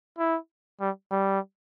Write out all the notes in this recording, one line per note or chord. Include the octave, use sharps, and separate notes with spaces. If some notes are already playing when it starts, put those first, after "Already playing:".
E4
G3
G3